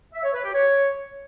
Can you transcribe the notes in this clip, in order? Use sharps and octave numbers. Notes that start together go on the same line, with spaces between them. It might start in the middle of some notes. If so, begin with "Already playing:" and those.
E5
C#5
B4
G4
C#5